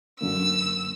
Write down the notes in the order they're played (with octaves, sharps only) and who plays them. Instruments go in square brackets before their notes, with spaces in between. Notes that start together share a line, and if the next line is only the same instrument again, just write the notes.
[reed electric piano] F#2 D3 A#3 [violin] E6